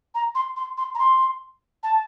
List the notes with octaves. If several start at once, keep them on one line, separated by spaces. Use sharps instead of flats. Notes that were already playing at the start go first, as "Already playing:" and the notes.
A#5
C6
C6
C6
A#5
C6
A5